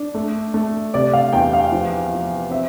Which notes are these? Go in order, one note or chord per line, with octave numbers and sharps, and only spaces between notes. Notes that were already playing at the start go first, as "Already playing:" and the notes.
Already playing: D4
A3
A3
C3 D5
F5
E2 G5
F5
F3
F3
C4 E5